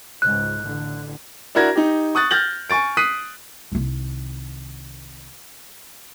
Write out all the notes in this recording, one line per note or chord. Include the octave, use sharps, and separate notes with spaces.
C#2 G#2 F#6
A1 D3
D4 E4 F#4 A#4 G#6 A#6
D#4 G4
C#6 D#6 F#6 A6
F6 G6 A6 A#6 F#7
G#5 C#6 A6 D7
D#6 F#6 B6 C7 D#7
C2 D#3